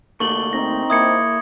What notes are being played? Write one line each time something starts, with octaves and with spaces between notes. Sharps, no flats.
D3 A3 A#3 C#6 F#7 G7
C4 D#4 A#6
A#3 E4 D#6 G#6 C#7